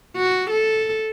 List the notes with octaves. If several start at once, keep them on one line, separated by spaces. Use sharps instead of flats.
F#4
A4